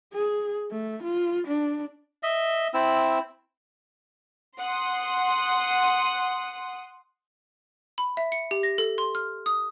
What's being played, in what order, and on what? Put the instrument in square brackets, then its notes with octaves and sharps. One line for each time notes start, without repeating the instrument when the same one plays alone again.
[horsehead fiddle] G#4
A3
F4
D4
[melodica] D#5 E5
C4 E4 E6
[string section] F#5 C6 D#6
[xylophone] B5
E5
C#7
G4
A#6
A4
C6
F6
D#6